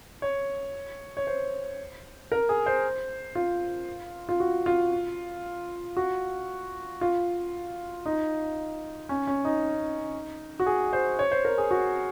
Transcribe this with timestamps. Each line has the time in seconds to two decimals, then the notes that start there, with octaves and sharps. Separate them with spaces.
0.22 C#5
1.17 C#5
1.27 C5
2.32 A#4
2.49 G#4
2.66 C5
3.35 F4
4.29 F4
4.40 F#4
4.66 F4
5.97 F#4
7.01 F4
8.05 D#4
9.09 C#4
9.27 C#4
9.45 D#4
10.60 F#4
10.66 G#4
10.93 C5
11.19 C#5
11.31 C5
11.45 A#4
11.58 G#4
11.71 F#4